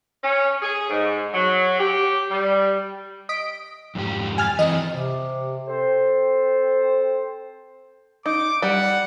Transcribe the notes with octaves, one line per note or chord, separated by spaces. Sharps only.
C#4
G#4
G#2
F#3
G4
G3
D#5 B6 D7
F2 G#2 G4
G#5 F6 A6
E3 C4 D#5
C3
C4 A4 C5
D#4 D6
G3 F#5